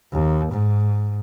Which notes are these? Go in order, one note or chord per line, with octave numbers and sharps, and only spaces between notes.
D#2
G#2